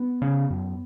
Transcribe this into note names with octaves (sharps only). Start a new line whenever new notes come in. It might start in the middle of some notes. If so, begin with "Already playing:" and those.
Already playing: B3
C#3
F#2